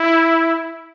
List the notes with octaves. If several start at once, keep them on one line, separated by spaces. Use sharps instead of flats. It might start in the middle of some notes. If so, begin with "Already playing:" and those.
Already playing: E4